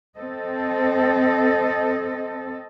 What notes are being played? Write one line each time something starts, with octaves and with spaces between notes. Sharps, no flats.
C4 A4 D#5